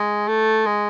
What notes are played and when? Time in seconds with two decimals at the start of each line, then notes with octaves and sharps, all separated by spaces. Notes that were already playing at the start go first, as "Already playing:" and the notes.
Already playing: G#3
0.28 A3
0.66 G#3